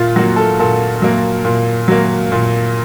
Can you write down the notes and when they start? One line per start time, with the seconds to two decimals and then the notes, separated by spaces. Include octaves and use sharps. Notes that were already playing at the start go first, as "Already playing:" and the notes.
Already playing: A#2 F4
0.16 F#3 A#3 F#4
0.36 A4
0.59 A#2 A4
1.02 F#3 A#3
1.45 A#2
1.88 F#3 A#3
2.32 A#2